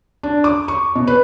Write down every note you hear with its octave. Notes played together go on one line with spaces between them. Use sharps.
D4
D6
C#6
B2
B4